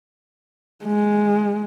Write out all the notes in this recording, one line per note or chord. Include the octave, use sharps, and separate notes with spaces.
G#3